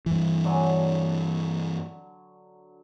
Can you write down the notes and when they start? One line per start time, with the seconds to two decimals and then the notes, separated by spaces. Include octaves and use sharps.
0.06 G2 E3
0.44 D3 F#3 G#5